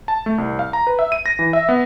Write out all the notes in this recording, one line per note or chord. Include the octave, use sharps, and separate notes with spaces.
A5
A3
C2
F5
A#5
B4
E5
D#7
A#6
E3
E5
B3